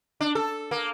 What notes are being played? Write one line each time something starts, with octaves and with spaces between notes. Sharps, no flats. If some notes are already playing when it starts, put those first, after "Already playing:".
D4
A4
A#3